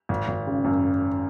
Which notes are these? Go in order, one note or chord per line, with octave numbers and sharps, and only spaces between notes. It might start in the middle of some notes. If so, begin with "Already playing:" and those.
G#1
G#1
C#3
F#2